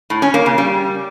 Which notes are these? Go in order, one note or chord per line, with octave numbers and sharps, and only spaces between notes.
A2
C#4
A#3
C#3
G3